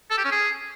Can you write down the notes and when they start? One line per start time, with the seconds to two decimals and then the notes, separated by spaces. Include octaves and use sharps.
0.11 A4
0.18 G4
0.25 C#4
0.32 G#4